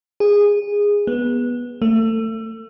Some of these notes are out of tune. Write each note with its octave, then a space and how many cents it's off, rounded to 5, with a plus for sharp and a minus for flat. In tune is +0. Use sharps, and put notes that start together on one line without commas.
G#4 -15
B3 -20
A3 +30